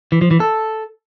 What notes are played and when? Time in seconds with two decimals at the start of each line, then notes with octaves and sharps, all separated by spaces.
0.12 E3
0.21 F3
0.31 E3
0.40 A4